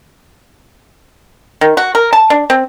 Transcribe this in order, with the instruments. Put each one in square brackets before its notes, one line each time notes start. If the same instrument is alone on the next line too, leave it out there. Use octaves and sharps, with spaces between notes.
[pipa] D#3
F#4
A#4
A5
D4
C4